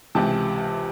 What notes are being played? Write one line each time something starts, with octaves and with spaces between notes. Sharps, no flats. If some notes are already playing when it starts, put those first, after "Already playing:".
C#2 C3 E3 G5 A5